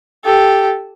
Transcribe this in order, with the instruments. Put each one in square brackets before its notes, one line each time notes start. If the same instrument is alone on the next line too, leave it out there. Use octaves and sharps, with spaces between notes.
[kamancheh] G4 A4